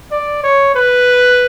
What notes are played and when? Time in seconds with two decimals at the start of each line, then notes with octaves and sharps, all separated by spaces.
0.11 D5
0.43 C#5
0.75 B4